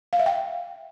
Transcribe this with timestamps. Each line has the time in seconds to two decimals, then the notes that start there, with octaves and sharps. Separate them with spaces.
0.13 F5
0.19 E5
0.26 G5